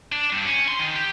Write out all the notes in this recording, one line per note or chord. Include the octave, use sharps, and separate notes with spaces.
D4
G2
C#4
C6
D#3
G4